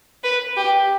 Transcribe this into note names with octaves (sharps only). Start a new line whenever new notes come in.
B4
G4